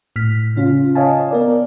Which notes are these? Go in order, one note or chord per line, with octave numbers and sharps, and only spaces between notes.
A2 F6 B6
C#3 C#4 F4
C#5 D#5 F5 G#5 A5
B3 A#4 D5